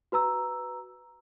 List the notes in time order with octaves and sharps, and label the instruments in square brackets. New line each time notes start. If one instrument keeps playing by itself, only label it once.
[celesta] F#4 B4 A#5 E6